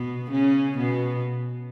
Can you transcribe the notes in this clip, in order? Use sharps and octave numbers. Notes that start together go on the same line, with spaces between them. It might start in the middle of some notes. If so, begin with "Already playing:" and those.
Already playing: B2 B3
C#3 C#4
B2 B3